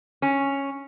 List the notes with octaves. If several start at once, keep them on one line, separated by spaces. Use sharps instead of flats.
C#4